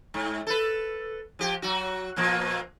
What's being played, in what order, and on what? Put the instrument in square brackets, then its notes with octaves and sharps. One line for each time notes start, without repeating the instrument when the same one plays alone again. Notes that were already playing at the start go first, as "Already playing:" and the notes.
[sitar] G#2
A4 B4
F3 G4
F#3 F#4
A#2 F3 A#3